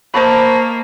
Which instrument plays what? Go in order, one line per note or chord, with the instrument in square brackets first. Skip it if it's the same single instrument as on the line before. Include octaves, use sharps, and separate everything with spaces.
[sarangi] A#3 [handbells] C5 B5 [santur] D#5 A5 C#6